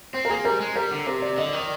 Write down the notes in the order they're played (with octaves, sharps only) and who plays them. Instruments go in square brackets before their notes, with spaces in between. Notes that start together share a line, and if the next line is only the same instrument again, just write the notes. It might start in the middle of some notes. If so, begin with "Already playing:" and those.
[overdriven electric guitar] C4 [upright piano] C5
[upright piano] A#4
[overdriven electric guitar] A#3 [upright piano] G#4
[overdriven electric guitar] G3 [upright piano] A#4
[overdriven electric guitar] G#3
[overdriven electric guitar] G3 [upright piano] A#4
[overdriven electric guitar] D3
[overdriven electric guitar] C3 [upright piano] A#4
[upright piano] D5
[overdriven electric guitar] D3 [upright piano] D#5
[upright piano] D5
[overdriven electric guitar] D#3
[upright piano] D5